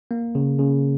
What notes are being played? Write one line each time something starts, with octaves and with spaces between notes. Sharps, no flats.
A#3
C#3
C#3